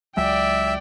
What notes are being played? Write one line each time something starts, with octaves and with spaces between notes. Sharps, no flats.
C#2 F#3 G#3 D5 E5 G5